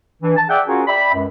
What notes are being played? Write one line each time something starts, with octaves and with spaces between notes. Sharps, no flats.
E3 D4
A5
G#4 D5 E5 F#5 G5
C#4 F4 F#4 G#4 A#4 G#5
D5 E5 G5 B5
C#2 F#2